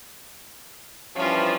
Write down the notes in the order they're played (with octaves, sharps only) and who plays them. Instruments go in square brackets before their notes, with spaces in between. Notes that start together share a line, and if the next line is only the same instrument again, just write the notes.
[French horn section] G2 E3 F3 [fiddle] C#4 F4